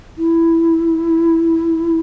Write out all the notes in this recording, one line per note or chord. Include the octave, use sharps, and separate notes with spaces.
E4